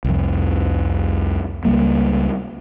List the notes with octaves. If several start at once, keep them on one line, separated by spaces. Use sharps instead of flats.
C2 F2
C#2 G3 A#3